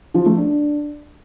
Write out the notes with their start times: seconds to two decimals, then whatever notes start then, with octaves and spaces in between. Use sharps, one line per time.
0.14 F3
0.26 A3
0.37 D4